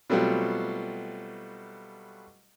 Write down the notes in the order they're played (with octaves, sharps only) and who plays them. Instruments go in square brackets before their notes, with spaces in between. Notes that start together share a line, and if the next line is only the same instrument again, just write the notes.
[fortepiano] B2 F#3 G3 A3 C4 F4